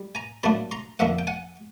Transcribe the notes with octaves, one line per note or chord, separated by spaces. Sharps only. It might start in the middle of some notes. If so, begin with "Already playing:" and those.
Already playing: G3
G#5 A#5
A#2 F#3 A3 D4 A5 B5
A#5 C6
F2 D3 F3 A#3 E5 F#5
G5
F#5 G#5